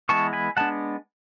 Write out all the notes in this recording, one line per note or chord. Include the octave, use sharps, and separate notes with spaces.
E3 G#3 B3 A5 C#6
G#5 B5
G#3 B3 D4 F#5 A5